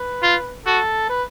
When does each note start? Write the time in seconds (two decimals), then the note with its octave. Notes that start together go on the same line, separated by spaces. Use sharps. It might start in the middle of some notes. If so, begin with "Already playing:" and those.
Already playing: B4
0.23 F4
0.65 F#4 A4
1.09 B4